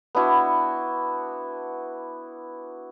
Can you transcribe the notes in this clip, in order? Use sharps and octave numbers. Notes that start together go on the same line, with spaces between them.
B3 D4 E4 F#4